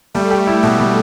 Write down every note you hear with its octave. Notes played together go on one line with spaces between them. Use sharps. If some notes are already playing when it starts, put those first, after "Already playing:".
G3 A3
G4
E4
B2 A3
G3